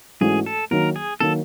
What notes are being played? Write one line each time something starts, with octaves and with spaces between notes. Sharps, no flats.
G#2 E3 A3 C#4 F#4 G#4
A4
D#3 F#3 A#3 A#4
G#4
D#3 F#3 A#3 A4